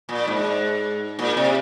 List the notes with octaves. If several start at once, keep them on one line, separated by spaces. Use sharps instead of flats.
A#2
G#2
A#2
C3